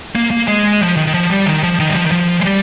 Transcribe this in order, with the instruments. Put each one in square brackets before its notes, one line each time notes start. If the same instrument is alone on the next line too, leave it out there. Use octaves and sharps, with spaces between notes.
[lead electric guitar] A#3
A#3
G#3
F3
D#3
D#3
F3
G3
D#3
F3
D#3
G3
F3
D#3
F3
G#3
G3